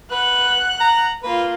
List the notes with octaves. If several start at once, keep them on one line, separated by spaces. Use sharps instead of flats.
B4 F#5 F#6
A#5
A#3 F4 B4